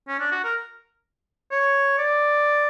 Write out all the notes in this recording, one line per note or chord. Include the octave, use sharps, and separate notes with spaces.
C#4
D4
F#4
A#4
C#5
D5